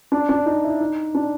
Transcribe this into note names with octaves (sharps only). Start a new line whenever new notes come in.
D4
D4
D#4
E4
D#4
D4